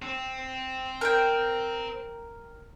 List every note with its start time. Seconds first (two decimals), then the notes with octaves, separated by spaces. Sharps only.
0.02 C4
1.01 A#4 G5